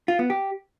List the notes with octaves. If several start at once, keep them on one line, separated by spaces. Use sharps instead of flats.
F4
B3
G4